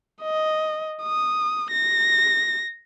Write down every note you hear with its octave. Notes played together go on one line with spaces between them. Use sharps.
D#5
D#6
A#6